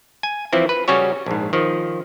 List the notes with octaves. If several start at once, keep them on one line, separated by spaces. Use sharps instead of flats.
G#5
E3 F3 C4 E4
B4
C#3 G3 C#4 F#4 C#5
A#1 G#2
D#3 F3